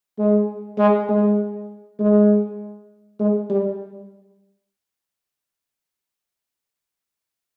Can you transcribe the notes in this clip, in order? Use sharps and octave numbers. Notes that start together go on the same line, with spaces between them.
G#3
G#3
G#3
G#3
G#3
G3